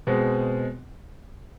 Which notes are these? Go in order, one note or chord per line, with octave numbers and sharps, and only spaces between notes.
B2 G#3 C4